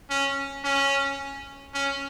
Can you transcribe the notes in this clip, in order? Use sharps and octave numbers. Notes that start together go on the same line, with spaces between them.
C#4
C#4
C#4